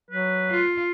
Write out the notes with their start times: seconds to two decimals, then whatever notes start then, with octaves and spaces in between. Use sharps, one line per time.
0.11 F#3 B4
0.51 F4